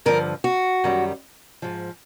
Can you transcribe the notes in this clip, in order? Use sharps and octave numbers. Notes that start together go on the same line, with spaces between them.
G2 D3 F3 A#4
F#4
F#2 D#3 G3
G#2 F3